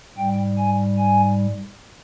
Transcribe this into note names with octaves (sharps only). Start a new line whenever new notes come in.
G#2 G3 G5
G#5
G#5